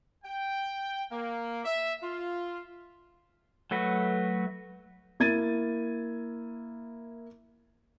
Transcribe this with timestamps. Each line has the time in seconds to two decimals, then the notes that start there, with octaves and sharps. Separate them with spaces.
0.25 G5
1.12 A#3
1.65 E5
2.03 F4
3.71 F#3 A3 F#4 B4
5.20 A#3 E4 G#6 A6 D#7